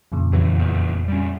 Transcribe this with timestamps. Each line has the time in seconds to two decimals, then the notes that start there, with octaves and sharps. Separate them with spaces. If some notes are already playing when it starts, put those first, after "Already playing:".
0.12 F2 A#2 C#3
0.33 E2 E3 F#3
0.57 F#1 E2
1.08 G3 C#4